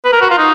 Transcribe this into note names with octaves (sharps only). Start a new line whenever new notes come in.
B4
A#4
F#4
F4
D#4